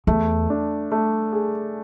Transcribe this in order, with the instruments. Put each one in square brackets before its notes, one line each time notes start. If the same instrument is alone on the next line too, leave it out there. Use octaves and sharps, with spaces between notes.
[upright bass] E2 [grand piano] A3
[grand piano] D4
A3
G#4